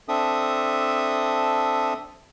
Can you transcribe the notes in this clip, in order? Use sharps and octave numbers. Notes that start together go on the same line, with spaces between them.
C4 D4 A4 E5 D#6